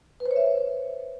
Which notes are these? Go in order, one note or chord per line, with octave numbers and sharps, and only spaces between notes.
B4
C5
C#5
E5